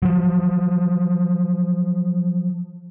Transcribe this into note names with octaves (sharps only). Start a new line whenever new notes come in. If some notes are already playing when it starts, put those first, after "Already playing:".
F3 F#3